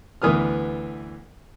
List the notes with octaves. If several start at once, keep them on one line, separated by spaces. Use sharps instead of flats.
D2 E3 B3 D#6 F6